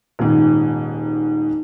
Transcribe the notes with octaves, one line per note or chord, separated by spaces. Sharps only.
D#1 G#2